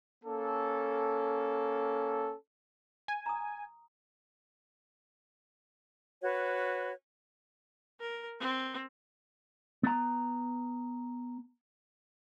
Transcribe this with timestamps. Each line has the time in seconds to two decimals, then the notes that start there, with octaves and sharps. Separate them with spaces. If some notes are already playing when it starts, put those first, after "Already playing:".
0.25 A#3 C#4 A4
3.08 G#5
3.26 A#5 D#6
6.22 F#4 B4 C#5
8.00 A#4
8.40 C4
9.83 B3 A#5